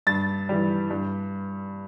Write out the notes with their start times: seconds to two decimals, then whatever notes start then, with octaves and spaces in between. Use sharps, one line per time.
0.07 G2 A6
0.49 E3 G3
0.91 G2